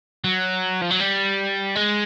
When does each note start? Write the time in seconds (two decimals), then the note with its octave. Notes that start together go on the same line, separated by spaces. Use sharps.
0.24 F#3
0.81 F3
0.90 F#3
1.00 G3
1.75 G#3